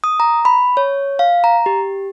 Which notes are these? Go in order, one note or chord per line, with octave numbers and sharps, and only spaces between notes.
D#6
A#5
B5
C#5
F5
A#5
G4